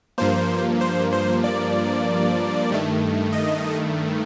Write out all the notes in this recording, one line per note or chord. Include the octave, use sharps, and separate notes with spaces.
G2 F3 A#3 C5
C5
C5
D5
G2 D#3 A3
D#5